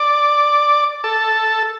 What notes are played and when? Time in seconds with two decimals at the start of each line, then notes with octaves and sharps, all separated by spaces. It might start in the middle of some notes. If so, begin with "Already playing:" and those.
Already playing: D5 D6
1.04 A4 A5